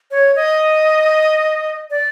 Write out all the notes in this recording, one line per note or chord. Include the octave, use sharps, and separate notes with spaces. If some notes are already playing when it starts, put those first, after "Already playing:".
C#5
D#5
D5